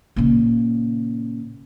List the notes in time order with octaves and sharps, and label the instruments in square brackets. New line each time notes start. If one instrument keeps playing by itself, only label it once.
[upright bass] A#2 C#3